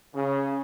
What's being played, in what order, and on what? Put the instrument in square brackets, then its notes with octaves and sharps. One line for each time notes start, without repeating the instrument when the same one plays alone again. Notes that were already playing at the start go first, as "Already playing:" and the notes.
[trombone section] C#3